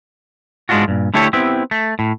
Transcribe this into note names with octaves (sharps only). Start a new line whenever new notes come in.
G#2 G#3 C#4 D4 F4 F#4
G2 A#2
D3 A3 E4 G4 A4 C#5
B3 C4 E4 G4
A3
A2